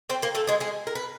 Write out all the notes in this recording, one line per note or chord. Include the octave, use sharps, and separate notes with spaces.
C4 C5
A#3 A#4
A3 A4
G#3 G#4
G#3 G#4
A#4
B4